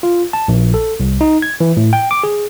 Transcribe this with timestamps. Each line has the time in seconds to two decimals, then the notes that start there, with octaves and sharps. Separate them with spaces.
0.03 F4
0.33 A5
0.48 A#1
0.74 A4
1.00 C2
1.21 D#4
1.42 G#6
1.61 E3
1.77 A2
1.93 G5
2.11 D6
2.23 G#4